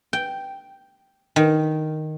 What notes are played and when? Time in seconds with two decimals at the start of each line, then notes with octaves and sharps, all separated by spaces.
0.13 G5
1.36 D#3